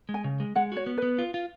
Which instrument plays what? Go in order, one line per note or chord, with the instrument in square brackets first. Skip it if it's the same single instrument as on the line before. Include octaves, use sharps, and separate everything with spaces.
[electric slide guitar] G#3
[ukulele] G#5
[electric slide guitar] C#3
G#3
[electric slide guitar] G#3 [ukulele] F#5
[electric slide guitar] F#4 [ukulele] C#5
[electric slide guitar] B3
[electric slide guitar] B3 [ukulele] B4
[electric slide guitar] F4
F4